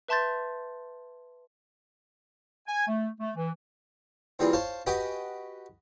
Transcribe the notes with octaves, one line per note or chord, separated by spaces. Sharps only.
B4 E5 A5 C6 G6 A6
G#5
A3
A3
E3
A#2 E3 G3 C4 G#4
C5 C#5 F5 A5 C#6
F#4 G4 B4 D#5 G5 G#5